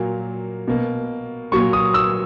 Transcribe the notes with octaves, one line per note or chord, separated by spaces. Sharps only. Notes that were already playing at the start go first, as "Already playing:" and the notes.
Already playing: A#2 F#3 A#3
B2 A#3
A#2 F#3 A#3 C#6
D#6
E6